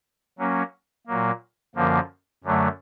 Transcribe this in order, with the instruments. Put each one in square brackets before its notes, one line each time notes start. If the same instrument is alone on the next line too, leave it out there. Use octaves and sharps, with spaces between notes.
[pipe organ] F#3 A#3 C#4
A#2 F#3 A#3
F#2 D3 F3 A#3
F#2 D3 F#3 A3